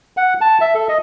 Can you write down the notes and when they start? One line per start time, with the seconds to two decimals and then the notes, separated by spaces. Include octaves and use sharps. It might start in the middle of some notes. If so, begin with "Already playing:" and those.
0.17 F#5
0.41 A5
0.61 E5
0.75 A4
0.89 D#5